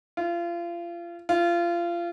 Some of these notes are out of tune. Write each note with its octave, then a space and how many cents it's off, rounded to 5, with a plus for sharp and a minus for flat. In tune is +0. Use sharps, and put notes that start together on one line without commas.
F4 -30
F4 -25